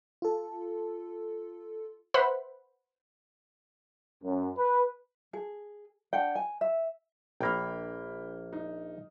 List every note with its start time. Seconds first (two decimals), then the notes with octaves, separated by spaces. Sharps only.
0.22 F4 A4
2.14 B4 C5 E5 F#5 B5
4.22 F#2
4.57 B4
5.33 G#4
6.13 D4 F#5 G5
6.35 G#5
6.61 E5
7.41 A#1 A#3 G5 B5 F6
8.53 D#4